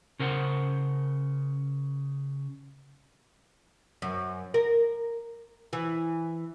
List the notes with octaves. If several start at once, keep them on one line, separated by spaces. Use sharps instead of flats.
C#3 A#4 C5 F#5
F#2
A#4
E3